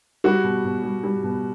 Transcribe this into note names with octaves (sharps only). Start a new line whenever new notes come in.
G3 F#4
B2
B2
G3
G3
B2